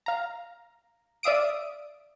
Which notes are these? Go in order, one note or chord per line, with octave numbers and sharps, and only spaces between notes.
F5 A#5
D5 E5 F5 D#6 D7